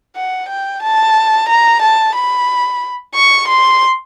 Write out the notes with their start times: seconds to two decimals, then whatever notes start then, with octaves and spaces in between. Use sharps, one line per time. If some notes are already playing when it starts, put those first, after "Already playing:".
0.16 F#5
0.49 G5
0.83 A5
1.49 A#5
1.82 A5
2.16 B5
3.15 C#6
3.48 C6